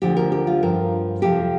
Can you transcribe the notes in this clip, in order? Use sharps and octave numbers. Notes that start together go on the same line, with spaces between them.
D2 D3 F3 G4
A#4
G4
F4
G2 F3 A#4
F2 C3 F3 G4